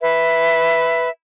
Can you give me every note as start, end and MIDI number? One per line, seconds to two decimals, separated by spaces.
0.01 1.08 71
0.01 1.08 76